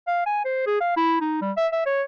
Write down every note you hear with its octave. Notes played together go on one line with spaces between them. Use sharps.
F5
G#5
C5
G#4
F5
E4
D#4
G3
E5
E5
C#5